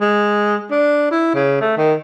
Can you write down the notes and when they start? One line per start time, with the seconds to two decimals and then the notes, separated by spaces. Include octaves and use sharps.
0.01 G#3
0.71 D4
1.11 E4
1.34 C#3
1.61 A3
1.77 D#3